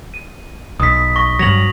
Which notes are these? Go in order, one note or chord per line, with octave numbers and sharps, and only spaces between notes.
D#7
B1 D#6 B6
C#6 A#6
G2 F#3 A#6 F7 F#7